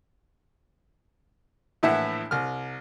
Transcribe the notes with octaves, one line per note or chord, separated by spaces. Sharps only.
A#1 A2 E3 E4 E5 F#5
C2 F6